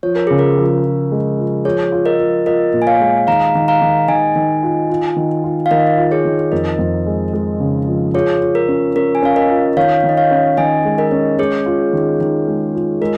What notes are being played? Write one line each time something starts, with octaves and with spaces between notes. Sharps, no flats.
F3 C#5
A#4
C#3 G#4
A#4
F3
F3
G#3
F3
F3 G#4 C#5
F4
A#4 D#5
F3
F4 A#4 D#5
A#2
G#5
C#5 F5
G#3
D#3 F5 A#5
D#3
F5 A#5
D#3
D#3 D#5 G#5
D#3
F4
F4
D#3
F4
F5
D#3 A#4 D#5
F4
G#4 C#5
D#3
F2 A#4 D#5
F2
G#3
G#3
C#3
F3
F4 G#4 C#5
F4
A#4
C#4
C#4 A#4
G#5
C#4 F5
A#4 D#5
F4
D#3 C#5 F5
D#3
D#5
C#5 F5
C#4
D#3 D#5 G#5
G#3
A#4 D#5
C#4
G#3 G#4 C#5
F4
D#3
D#3
G#3
F4
G#3 A#4